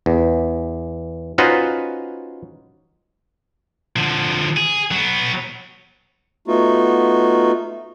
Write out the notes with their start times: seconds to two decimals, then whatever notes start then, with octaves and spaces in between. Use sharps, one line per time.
0.06 E2
1.38 C#4 D#4 F4 F#4 B4 C5
3.96 D3 F3
4.57 G#4
4.91 F#3 B3
6.48 A3 B3 D#4 F4 F#4